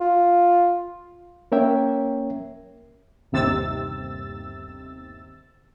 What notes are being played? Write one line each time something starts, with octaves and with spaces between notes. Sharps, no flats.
F4
A#3 C#4 A#4 C#5 E5 G5
G1 D#2 C3 E6 A6